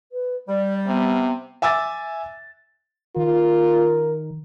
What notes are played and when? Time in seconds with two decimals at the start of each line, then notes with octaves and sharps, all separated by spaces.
0.12 B4
0.48 G3 D5
0.86 C3 B3
1.62 E5 G#5 D6 E6 A6
3.16 D#3 F4 A#4